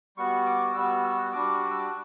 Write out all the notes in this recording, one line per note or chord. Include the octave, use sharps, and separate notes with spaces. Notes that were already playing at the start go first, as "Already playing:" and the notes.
G3 B3 F#4 C#6
D6
G3 B3 F#4 E6
E6
G3 D4 F#4 D6
D6
E6
D6